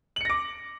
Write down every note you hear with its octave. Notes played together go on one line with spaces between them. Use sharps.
D6 A#6 C#7 F#7